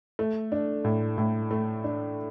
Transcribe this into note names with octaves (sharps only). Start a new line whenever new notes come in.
A3
D4
A2
A2
A3
D4